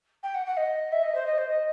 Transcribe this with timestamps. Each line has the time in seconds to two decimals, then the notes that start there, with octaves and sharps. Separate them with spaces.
0.23 G5
0.34 F#5
0.46 F#5
0.57 D#5
0.92 E5
1.03 D#5
1.15 C5
1.26 D#5
1.38 C5
1.49 D#5